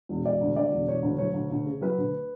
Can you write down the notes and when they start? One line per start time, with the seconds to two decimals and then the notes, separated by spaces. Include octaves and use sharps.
0.09 E1
0.24 E1 D5
0.41 D2
0.56 D3 D5
0.72 E1
0.88 E1 C#5
1.03 D2
1.18 F#3 C#5
1.34 D2
1.50 D2
1.65 C#3
1.81 F#3 B4
1.98 D2